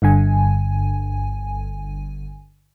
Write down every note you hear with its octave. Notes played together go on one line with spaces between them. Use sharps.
G1 G2 D3 G#5